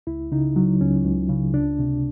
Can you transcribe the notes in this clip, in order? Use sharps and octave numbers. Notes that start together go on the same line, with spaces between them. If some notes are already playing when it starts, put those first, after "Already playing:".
C#2 E4
C#3 D#4
F#3
C#2 C#4
C#2
C#3
C#2 D4
C3